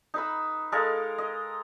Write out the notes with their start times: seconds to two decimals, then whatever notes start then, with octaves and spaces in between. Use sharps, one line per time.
0.14 D#4 B4 E6
0.72 G#3 A4 A#4 F5
1.18 D#5